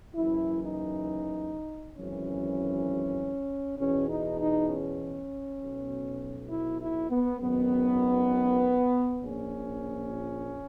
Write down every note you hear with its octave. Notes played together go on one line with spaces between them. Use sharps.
F#1 F#2 E3 E4
D#4
G#1 F#2 E3 C#4
E2 B2 C#4
D#4
D#4
C#4
B1 B2
E4
E4
B3
G#1 F#2 D#3 B3
A#1 A#2 C#4